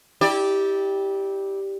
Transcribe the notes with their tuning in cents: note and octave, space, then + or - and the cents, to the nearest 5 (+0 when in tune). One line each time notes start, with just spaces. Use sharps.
E4 -35 G4 +0 D5 +0